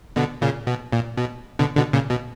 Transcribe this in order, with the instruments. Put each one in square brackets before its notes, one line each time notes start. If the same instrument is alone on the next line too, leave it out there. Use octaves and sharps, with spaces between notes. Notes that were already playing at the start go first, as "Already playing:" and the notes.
[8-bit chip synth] B2 D3
A#2 C#3
B2
A#2
B2
B2 D3
B2 D3
A#2 C#3
B2